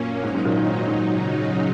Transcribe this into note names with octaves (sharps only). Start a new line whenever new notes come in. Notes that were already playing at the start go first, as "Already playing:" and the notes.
Already playing: F#2 A#2 A#3 C#4
G#2 F#3 D#4
G#2
A#2
D#3
G#2
G#2
C#3 F#3 D#4